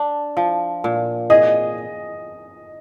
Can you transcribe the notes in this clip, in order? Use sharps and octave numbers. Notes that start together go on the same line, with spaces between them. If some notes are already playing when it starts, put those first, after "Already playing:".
Already playing: D4
F3
A#2
G#4 D#5